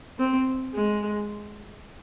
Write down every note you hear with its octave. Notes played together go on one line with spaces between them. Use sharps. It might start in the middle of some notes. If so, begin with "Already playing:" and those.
C4
G#3